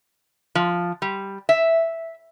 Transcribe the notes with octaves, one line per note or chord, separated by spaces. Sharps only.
F3
G3
E5